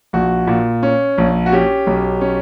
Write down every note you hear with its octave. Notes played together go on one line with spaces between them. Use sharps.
A#1 F#4
A#2
C#4
A#1
F#4
C#4 G4
B1
C#4